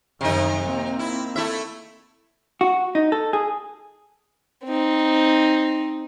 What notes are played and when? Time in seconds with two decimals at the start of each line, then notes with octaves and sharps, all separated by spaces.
0.21 F#2 C3 D#3 D#4
0.64 A#3 C4
0.99 E4
1.36 A3 E4 E5
2.61 F#4
2.95 D#4
3.12 A4
3.33 G#4
4.65 C4 D#4